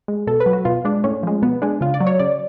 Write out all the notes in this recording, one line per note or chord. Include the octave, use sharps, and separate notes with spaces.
G#3
B2 A4
B4
F#3
F#4
B2 F4
G#3 D4
A2 C#4
F3 G#3
B2 B3
G#3 D4
C#3 F4
D5
F#3
C#5
C#3 D5